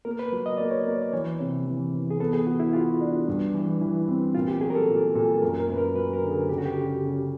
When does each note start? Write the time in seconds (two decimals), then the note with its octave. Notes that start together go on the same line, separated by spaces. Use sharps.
0.05 A#3 A#4
0.19 B4
0.32 F#3
0.46 D#5
0.58 A#3 D5
0.71 C#5
0.84 A#3 D5
1.02 D5
1.13 E3 C#5
1.40 C3
1.66 E3
1.94 E3
2.10 G#4
2.20 B3 A4
2.33 G#4
2.46 F#4
2.60 E4
2.73 F4 F#4
3.01 D4
3.28 G2
3.54 E3
3.81 E3 E4
4.08 C4
4.35 A#2 F4
4.48 G4
4.61 F#3 G#4
4.70 A#4
4.75 A4
4.88 A#2
5.15 A#2 A4
5.42 F#2 A#4
5.60 A#4
5.69 F#2 B4
5.78 A#4
5.96 F#3 B4
6.13 A#4
6.22 D3
6.31 G#4
6.49 C#3 G4
6.58 F#4
6.66 G4
6.76 C#3
7.03 C#3